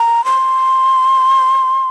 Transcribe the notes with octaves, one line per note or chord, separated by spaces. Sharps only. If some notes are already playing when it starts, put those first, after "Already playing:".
Already playing: A#5
C6